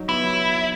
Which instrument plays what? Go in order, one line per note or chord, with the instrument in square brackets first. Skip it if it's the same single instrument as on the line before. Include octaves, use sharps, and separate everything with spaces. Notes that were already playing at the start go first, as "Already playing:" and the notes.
Already playing: [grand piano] F#3 D#4
[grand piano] B3 [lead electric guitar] E4
[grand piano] F#3